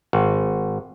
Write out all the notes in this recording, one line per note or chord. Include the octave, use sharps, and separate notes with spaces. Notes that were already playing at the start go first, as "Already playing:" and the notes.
G#1